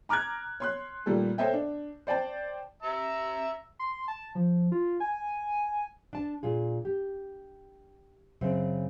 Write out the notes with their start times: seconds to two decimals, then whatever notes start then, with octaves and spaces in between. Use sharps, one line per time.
0.09 A#5 D6 F6 F#6 G#6
0.60 C#5 C6 F#6
1.06 A#2 D#3 G3 A3 A4
1.38 A4 C5 C#5 D#5 E5 G5
1.53 D4
2.07 C5 D5 G5 A5
2.83 E5 A#5 E6
3.79 C6
4.08 A5
4.35 F3
4.72 F4
5.00 G#5
6.13 D4 A5
6.43 A#2 F4 G#4
6.85 G4
8.41 F#2 C#3 C4